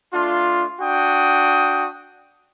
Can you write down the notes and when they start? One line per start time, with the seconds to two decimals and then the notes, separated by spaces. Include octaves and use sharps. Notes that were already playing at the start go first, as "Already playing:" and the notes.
0.12 A3 D4 F4
0.81 D4 F#4 G5 D#6